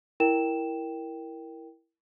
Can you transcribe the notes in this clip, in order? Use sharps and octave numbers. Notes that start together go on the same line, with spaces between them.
E4 A#4 G5 E7